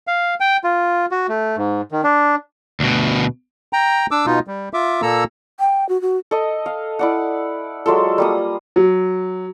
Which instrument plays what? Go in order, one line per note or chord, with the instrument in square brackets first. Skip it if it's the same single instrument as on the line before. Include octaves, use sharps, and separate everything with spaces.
[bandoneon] F5
G5
F4
F#4
A3
G#2
D#3
D4
[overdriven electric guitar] D2 B2
[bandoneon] G5 A#5
D4 D6 E6
B2 D#4 F4
G3
F4 E5 D6
A#2 A#3 A4 A#5 E6
[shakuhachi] G5
F#4
F#4
[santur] A4 D#5
F5
E4 D5 F#5
F#3 G#3 F4 A4
G3 A#3 D#6
[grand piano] F#3